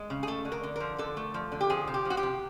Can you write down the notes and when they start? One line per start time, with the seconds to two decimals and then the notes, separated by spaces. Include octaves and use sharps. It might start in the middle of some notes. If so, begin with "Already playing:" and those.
Already playing: G#3
0.10 C#3
0.23 G#4
0.27 A3 A4
0.45 D3
0.52 A#4
0.63 D3
0.76 F3 A#4
0.98 D3 A4
1.17 A3
1.34 F3
1.52 D3
1.61 G4
1.70 F3 G#4
1.87 C3
1.94 G4
2.05 F3
2.10 F#4
2.17 G4
2.23 C3